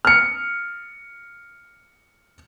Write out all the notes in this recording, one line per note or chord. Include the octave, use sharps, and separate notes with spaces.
F6 C#7